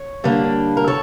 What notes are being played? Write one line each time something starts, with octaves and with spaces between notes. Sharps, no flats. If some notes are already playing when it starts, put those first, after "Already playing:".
Already playing: C#5
D3 G3 A#3 D4
A#4
A4 C#5